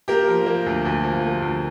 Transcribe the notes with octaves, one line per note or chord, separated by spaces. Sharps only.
A#3 G4 A#4
F3
A#3
D2
D2
F3
A#3
D2